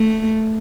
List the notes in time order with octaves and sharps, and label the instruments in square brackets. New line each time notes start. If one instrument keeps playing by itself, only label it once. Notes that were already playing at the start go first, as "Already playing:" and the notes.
Already playing: [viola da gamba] A3